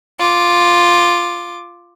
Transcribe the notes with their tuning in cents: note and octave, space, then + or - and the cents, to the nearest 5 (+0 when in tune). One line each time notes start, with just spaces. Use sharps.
F4 +0 D6 +0